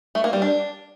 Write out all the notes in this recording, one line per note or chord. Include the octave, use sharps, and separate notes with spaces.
A3
A#3
G3
D4